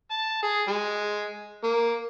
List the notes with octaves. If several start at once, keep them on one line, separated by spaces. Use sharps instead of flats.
A5
G#4
G#3
A#3